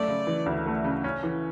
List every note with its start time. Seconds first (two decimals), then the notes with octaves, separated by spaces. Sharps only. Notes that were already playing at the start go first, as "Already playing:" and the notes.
Already playing: F#2 A3 D5
0.08 C#3
0.27 E3
0.46 D2
0.66 A3
0.84 C#3
1.04 C#4
1.23 E3